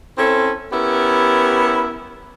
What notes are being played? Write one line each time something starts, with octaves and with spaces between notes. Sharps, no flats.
C4 C#4 E4 A4
B3 C#4 E4 G4 A#4